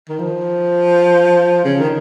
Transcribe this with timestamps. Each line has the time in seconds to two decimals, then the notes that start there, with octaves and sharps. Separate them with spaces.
0.09 D#3
0.19 F3
1.65 C#3
1.80 D#3